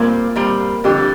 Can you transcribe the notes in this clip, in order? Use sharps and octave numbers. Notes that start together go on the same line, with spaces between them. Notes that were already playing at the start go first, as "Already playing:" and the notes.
Already playing: A#2 G3 A#3 C4
A#2 G3 C4
F2 D3 G3 G4